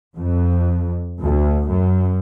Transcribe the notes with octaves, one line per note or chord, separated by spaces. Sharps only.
F2
D2
F#2